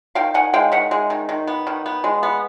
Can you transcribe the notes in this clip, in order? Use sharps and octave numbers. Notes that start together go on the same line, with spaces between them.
D#3 F5 G5
D#3 F#5 G#5
G#3 F5 G5
D#3 E5 F#5
G#3
D#3
D#3
B3
D#3
B3
G#3
B3